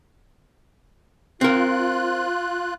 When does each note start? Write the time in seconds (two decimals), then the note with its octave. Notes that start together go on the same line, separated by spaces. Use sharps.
1.41 C4 F4 A#4 F#6